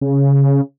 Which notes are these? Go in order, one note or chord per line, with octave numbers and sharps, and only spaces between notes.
C#3